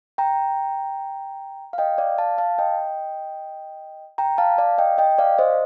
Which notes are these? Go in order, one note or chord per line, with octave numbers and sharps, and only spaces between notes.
G5 A#5
F5
D#5 G5
D5 F5
F5 A5
F5 A5
D#5 G5
G5 A#5
F5 A5
D5 F5
D#5 G5
D#5 G5
D5 F5
C5 D#5